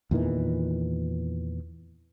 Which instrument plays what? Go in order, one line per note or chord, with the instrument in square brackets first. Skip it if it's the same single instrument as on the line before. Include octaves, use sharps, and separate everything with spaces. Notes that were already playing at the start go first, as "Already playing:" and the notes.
[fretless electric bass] E2 A#2 D#3 E3